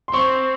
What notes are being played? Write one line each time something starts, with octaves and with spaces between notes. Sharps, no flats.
C6
C4 C#6